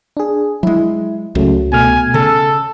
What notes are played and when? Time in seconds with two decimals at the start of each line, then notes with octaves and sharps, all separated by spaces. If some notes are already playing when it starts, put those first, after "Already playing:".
0.17 D4 G#4
0.63 F#3 G#3 E4
1.35 C#2 C#3 F#3 A3
1.73 B2 A3 G#5 F6
2.14 C#3 A4